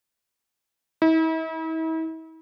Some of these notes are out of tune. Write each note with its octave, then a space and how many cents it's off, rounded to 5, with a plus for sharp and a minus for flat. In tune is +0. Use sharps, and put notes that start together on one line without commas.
E4 -40